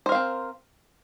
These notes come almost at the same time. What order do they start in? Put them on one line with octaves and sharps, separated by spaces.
C5 A#4 F5 C4